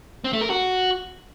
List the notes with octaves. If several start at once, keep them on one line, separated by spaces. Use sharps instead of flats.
C4
A3
A#4
F#4